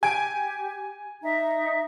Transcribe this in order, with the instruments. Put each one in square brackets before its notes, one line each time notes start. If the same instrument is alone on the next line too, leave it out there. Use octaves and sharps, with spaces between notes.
[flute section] G4 [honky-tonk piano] G#5 G#6 D7
[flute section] D#4 E5 A#5